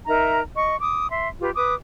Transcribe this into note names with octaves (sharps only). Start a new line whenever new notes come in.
D#4 A#4 E5 A#5
D#5 C#6
D6 D#6
E5 C6
F4 G4 B4
B4 D6 D#6